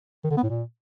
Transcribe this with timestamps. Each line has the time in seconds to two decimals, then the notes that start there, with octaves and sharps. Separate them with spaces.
0.24 D#3
0.31 D3
0.37 B3
0.43 A2
0.50 A#2